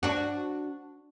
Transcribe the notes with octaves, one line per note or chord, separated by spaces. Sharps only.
D4 F#4